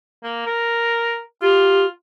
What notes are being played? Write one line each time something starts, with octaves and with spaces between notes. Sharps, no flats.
A#3
A#4
F4 G4